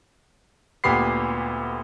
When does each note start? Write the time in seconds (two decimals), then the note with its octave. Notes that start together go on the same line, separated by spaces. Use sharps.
0.84 D2 A#2 B3 G4 B5 C7